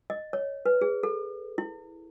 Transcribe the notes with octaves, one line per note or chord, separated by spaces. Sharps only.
D#5
C#5
B4
G#4
A4
E4